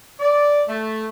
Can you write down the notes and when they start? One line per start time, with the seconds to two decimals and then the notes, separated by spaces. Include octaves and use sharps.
0.20 D5
0.68 A3